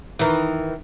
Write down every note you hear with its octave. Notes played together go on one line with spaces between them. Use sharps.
D#3 E3